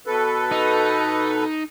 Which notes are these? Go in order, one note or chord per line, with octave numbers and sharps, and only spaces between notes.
B2 A4 B4
D#4